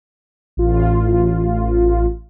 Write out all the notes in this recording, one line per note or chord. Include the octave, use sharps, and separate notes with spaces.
A1 F4